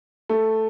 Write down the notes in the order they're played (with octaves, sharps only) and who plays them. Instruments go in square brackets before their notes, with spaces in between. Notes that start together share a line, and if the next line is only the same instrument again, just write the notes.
[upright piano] A3